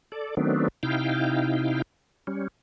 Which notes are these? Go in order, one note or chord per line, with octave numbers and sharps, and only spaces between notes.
A4 D5
D#3 F#3 A3 B3 C4 D4
C3 D#4 E4 F5 G5
G3 C#4